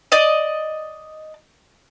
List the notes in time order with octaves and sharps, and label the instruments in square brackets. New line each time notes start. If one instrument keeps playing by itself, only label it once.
[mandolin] D5 D#5